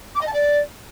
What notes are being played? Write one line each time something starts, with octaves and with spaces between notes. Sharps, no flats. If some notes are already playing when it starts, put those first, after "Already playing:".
D6
D#5
A5
D5